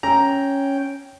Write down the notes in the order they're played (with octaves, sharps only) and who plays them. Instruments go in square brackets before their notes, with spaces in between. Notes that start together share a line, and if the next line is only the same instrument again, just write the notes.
[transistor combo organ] C#4 G5 [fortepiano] A#5